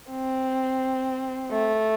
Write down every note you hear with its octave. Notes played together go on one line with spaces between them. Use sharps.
C4
A3